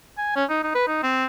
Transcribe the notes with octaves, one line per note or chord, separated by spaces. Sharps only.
G#5
C#4
D#4
D#4
B4
D#4
C4